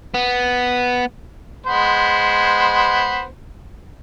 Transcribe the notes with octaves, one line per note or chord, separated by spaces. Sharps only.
B3
G#3 B3 C5